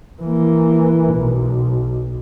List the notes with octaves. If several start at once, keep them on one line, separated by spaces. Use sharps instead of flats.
E3 A#3
B1